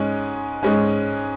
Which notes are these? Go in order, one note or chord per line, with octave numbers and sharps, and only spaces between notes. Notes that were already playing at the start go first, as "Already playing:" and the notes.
Already playing: G#2 G#3 C#4
G#2 G#3 C#4